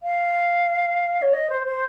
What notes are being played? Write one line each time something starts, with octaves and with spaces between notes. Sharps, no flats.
F5
C#5
D#5
C5
C5